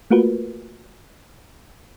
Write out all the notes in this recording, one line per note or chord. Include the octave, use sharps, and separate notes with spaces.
A3 A#3 F4 F#4 A#4 B4